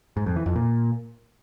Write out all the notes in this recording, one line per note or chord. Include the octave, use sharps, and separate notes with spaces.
G#2
F2
E3
F2
A#2